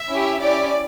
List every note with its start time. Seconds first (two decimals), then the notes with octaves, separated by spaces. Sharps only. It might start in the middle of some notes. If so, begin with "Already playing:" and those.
Already playing: E5
0.11 C#4 E4 G4
0.42 C#4 E4 G4 D5